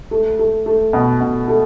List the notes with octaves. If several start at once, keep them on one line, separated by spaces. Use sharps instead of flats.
A3
A3
A3
B2
B2
A3